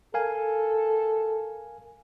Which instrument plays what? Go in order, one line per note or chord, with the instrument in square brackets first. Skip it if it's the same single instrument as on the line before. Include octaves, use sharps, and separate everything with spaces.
[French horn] A4 [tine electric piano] A#4 F5 G#5